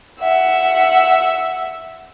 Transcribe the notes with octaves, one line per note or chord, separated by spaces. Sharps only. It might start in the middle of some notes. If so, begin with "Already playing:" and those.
E5 F#5